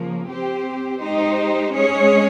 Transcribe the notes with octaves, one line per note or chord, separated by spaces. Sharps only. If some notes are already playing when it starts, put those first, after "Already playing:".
Already playing: C#3 F3 A#3
C4 G4 C5
G#3 D#4 G4 C5
G#3 C#4 G#4 C#5